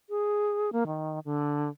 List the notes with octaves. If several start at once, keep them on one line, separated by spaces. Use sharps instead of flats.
G#4
A#3
D#3
D3